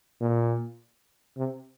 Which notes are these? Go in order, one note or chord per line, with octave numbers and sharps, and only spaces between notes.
A#2
C3